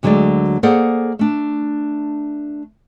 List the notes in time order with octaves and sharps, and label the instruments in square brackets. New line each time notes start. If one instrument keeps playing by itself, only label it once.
[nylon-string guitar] D2 D3 F#3 G#3 A4 D5
A#3 G#4 A4 C5 D5 F#5
A3 D4